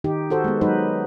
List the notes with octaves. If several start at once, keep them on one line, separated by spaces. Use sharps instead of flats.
D#3 D#4 G4
F#4 A4 C5
G#3 B3
F#3 G#3 D#4 B4 C5